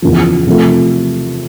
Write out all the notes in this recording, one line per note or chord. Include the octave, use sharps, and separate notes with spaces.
E2 C#3 F3
C3 F3 A3